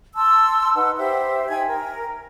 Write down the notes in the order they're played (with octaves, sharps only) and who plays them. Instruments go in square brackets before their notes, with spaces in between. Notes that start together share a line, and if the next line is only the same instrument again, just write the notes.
[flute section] A5 C6 E6
D#4 B4 F#5
G4 C5 E5
D#4 G5 G#5 G#6
A#4